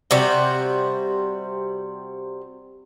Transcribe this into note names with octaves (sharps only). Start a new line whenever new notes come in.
C3 G3 F#4